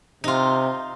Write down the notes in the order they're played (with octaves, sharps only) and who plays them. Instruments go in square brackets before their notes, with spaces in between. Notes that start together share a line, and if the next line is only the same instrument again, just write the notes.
[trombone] C3 [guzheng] D#4 F4